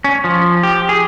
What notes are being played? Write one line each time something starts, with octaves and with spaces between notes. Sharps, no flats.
C#4
F3
G4
G#4